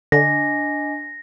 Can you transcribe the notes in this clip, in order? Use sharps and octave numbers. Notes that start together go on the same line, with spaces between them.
D3 D4 D#5 G#5 A#6